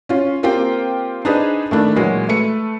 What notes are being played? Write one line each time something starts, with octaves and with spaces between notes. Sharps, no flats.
C#4 F4
A#3 C4 F4 G4 G5
D4 D#4 G#4 B4 C5
D#3 A3 D4 E4
A#2 E3 F#3 G#3 F#4
A3 B4 C#7